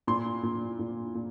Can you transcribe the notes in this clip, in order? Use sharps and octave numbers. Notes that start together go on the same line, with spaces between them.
A#2 C6
A#2
A#2
A#2